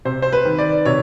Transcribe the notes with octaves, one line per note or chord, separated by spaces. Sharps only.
C3 C5
C5
B4
D#3
D5
C3 C#5